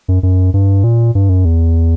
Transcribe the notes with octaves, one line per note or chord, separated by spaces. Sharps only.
F#2
F#2
G2
A#2
G2
F#2
E2